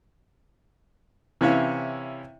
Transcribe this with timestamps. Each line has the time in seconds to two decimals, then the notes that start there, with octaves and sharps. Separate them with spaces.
1.41 C3 E3 C#4 E4 C#5 F5